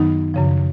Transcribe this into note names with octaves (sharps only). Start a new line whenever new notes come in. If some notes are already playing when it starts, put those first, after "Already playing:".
Already playing: F#2 D#3 F#3 B3 D#4
F#2 C#3 F3